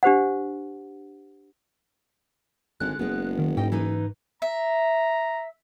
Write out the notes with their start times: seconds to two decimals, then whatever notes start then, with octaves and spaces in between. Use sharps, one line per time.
0.03 D4 G4 C5 F#5
2.80 G#1 D3 G#3 F#6
2.99 F#1 G#3 B3
3.39 D#3
3.57 G#2 D#5 G5
3.72 E3 D#4 B4
4.42 E5 A#5